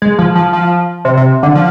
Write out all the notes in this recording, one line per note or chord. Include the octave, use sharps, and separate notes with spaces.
G#3
F3
F3
F3
C3
C3
D3
F3